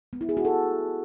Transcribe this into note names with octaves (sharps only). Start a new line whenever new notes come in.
B3
E4
G#4
F#4
A4